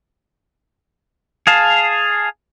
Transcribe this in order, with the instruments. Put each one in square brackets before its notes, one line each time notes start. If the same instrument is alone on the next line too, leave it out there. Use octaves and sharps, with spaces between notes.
[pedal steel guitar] G#4 F5 A5